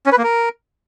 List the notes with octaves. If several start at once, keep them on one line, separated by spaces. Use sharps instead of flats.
C#4
B4
A#3
A#4